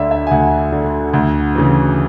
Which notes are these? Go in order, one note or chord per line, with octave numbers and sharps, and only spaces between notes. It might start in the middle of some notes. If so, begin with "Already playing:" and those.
Already playing: D2 D3 D5 E5
E5
G#5
D2 F#5
D3
D2
C#3 E3